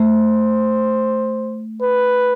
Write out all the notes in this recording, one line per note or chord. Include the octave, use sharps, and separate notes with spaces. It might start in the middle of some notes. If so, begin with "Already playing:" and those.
Already playing: A3 C5
B4